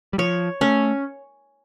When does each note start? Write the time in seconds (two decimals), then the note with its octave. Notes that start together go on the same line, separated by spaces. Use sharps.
0.13 G3
0.18 F3 C#5
0.61 A3 C#4